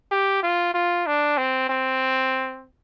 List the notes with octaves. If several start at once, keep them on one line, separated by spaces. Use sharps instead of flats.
G4
F4
F4
D4
C4
C4